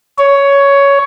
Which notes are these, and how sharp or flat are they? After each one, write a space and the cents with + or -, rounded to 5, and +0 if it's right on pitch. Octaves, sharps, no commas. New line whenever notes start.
C#5 +10